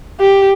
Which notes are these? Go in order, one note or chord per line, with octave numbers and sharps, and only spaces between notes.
G4